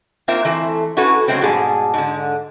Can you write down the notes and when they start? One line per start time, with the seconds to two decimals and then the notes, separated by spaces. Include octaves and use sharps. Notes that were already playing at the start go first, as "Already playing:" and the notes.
0.28 A#3 C4 F4 A#4 E5
0.45 E3 A3 C4
0.97 C#4 E4 F#4 A4 B4
1.27 C#3 F#3 G#3 A3 C4 C#4
1.41 G#2 B2 G3 G#4 A5
1.94 G#2 D3